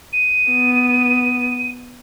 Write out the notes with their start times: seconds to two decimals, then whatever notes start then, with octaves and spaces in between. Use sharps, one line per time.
0.13 D#7
0.52 B3